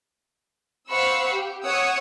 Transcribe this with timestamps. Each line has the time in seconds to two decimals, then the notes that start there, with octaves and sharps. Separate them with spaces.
0.89 C5 F5 F#5 B5 C#6 E6
1.31 G4
1.63 C#5 F#5 D#6 E6